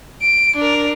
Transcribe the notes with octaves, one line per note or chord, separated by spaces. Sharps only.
D7
D4 A#4